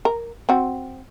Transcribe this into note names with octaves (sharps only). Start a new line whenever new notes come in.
A#4
C4 F#4